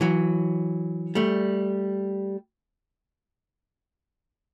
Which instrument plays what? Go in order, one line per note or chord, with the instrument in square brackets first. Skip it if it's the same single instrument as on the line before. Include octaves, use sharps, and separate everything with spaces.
[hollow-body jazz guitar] E3 F#3
G3 A3